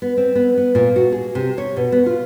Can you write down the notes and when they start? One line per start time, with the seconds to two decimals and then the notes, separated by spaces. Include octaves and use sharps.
0.02 B3
0.17 C4
0.35 B3
0.57 B3
0.75 A#2
0.96 F#4
1.12 G#4
1.35 C3
1.58 C#5
1.77 B2
1.92 B3
2.06 F4